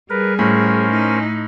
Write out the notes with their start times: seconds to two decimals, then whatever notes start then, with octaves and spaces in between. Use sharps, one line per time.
0.10 G3 G#4 A#4 B4
0.39 A2 C#4 A#4 C5
0.92 A3 D#4